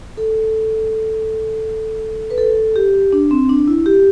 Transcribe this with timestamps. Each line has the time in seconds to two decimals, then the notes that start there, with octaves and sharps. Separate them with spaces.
0.17 A4
2.30 B4
2.38 A4
2.76 G4
3.13 D4
3.31 C4
3.49 D4
3.67 E4
3.86 G4